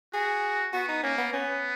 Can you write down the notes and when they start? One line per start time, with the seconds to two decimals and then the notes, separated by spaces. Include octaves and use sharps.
0.14 F#4 G#4
0.73 B3 F#4
0.89 D#4
1.03 A#3 C#4
1.18 B3
1.33 B3 C#4